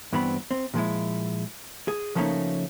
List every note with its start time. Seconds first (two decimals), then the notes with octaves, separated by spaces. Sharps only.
0.13 G2 E3 B3 C4 B5
0.51 C4
0.74 A#2 F3 G#3 E4
1.88 G#4
2.15 C#3 F3 A3 A#3 C#4 D#4